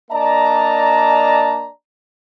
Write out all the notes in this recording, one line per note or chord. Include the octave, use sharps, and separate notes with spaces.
A#3 D4 D5 D#5 A5 A#5